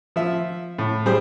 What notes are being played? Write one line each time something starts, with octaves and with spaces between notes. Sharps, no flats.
F3 E5
A2
G3 G#4 C5